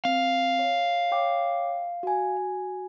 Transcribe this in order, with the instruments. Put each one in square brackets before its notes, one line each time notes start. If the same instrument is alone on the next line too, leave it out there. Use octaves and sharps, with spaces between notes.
[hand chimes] C4 [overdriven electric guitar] F5
[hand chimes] C#5
C#5 G5 D6
F#4 G#5